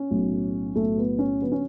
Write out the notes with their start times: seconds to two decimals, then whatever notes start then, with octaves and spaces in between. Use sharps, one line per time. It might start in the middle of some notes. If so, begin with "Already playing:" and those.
Already playing: C#4
0.10 B1 A2 F#3
0.75 B1 A2 F#3 A3
0.98 B3
1.19 C#4
1.41 D3 F#3 B3
1.52 C#4